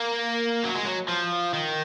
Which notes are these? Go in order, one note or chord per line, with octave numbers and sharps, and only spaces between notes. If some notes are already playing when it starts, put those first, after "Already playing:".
Already playing: A#3
F#3
G#3
F#3
F3
D#3